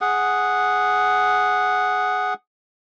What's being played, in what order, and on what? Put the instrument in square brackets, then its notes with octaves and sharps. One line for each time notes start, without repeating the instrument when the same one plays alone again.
[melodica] G#4 F#5